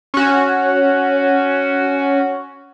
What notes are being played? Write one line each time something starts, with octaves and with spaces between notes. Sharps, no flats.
C#4 F#4